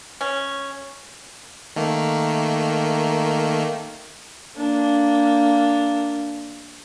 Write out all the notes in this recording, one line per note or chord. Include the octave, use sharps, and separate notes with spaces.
C#4
D#3 A3 A#3
A#3 D4